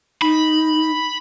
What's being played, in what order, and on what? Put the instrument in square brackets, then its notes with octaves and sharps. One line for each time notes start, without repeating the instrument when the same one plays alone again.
[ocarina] D#4 [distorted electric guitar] B5